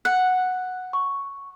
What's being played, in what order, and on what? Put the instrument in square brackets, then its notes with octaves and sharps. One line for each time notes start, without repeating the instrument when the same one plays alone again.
[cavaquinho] F#5 [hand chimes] F#6
[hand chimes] C#6